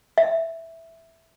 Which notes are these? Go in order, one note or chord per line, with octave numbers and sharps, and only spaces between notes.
E5